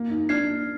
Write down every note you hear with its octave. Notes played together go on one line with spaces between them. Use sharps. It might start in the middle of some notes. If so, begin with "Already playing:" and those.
Already playing: A#3
D#4
D4 F6 G#6 C7